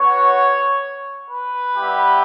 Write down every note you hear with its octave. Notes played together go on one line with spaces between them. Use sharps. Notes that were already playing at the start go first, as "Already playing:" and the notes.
Already playing: B3 F#4 C#5
B4
G3 B3 E4 G4